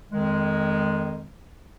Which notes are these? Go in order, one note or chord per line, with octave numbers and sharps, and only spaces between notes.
F2 D#3 G#3